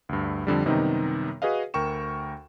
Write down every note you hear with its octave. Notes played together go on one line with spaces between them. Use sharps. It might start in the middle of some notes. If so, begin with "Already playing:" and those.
D2 G2
F2 D3 G3
F#2 C3 D#3 G3 B3 D#4
F#4 G#4 B4 D#5 F5
D2 A#4 G5 C#6 E7